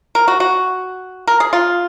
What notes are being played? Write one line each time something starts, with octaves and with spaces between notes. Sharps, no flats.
A#4
F#4
F#4
A#4
G#4
F4